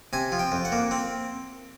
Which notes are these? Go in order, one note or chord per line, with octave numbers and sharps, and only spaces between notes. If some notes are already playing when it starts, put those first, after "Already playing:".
C3 G#5
F3
G5
F2
F#5
A#3
C4